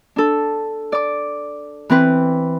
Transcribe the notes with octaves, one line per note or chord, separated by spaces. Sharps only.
D4 A4
D5 D6
E3 C4 B4